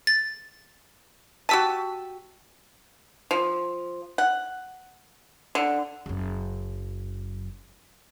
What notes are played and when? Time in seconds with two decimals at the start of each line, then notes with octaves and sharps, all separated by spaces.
0.07 A6
1.49 F#4 G4 A5 E6 B6 D#7
3.31 F3
4.18 F#5
5.55 D3
6.06 F#1 F#2